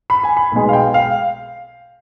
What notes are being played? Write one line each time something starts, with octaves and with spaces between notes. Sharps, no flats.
B5
G#5
B5
B1 B2 G#3
F5
G5
F5